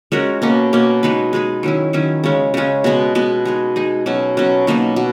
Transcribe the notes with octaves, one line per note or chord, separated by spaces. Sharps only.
G#3 C#4 F#4 A#4
B2 A#3 C#4
B2 A#3 C#4
G#3 D#4 G#4 B4
G#3 D#4 G#4 B4
D#3 F#3 C#4 E4
D#3 F#3 C#4 E4
C#3 G#3 C#4
C#3 G#3 C#4
B2 G#3 B3
B2 G#3 B3
G#3 D#4 G#4
G#3 D#4 G#4
B2 F#3 C#4
B2 F#3 C#4
B2 F#3 A#3 D#4
B2